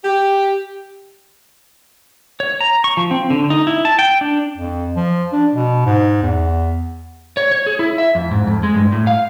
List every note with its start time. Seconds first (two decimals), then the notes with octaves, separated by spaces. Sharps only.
0.04 G4
2.40 C#5
2.61 A#5
2.84 C#6
2.97 F3
3.11 C4
3.30 D3
3.50 D#4
3.67 E4
3.85 A5
3.99 G5
4.21 D4
4.57 F2
4.96 F3
5.33 D4
5.55 B2
5.86 G#2
6.22 E2
7.37 C#5
7.51 C#5
7.67 G#4
7.79 E4
7.98 E5
8.15 F2
8.31 G#2
8.47 F2
8.63 G#3
8.76 G2
8.92 A2
9.07 F5